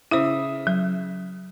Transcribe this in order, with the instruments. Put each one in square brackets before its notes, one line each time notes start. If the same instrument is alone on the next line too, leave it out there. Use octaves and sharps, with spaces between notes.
[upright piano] C#3 E5 D#6 [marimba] E4 C5
[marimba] F#3